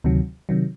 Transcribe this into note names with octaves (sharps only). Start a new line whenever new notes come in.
D2 C3 D#3 F#3
C3 D#3 F#3